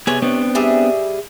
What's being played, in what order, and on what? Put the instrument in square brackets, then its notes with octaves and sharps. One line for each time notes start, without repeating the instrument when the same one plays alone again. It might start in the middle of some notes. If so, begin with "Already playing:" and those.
[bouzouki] C3 C#5 [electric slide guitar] B3 G#4
[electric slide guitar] B3 C4 D4
[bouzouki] G3 G#4 E5